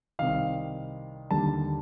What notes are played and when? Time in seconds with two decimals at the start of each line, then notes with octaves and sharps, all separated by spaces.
0.19 C2 C3 D#3 F5
1.31 D#2 D3 G3 A5